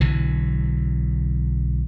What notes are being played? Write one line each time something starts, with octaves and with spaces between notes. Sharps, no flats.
B1 D3 E3 F#3